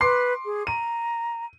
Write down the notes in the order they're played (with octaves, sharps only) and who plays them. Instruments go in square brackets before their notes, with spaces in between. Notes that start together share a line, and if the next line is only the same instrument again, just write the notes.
[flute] B4 [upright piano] C6 D6 C7
[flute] G#4
[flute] A#5 [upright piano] D#7